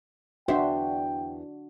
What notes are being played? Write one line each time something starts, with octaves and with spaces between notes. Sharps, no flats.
E2 D4 F#4 C5 E5 G5